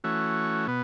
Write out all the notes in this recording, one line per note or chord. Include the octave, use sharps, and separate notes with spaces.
E3 A3 C#4 F#4
B2 B3